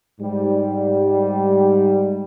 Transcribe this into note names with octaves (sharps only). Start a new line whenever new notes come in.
G#2 G3